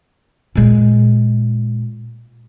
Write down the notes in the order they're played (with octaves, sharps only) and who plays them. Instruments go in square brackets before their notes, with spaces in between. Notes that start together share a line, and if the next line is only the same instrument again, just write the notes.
[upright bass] A#2 G#3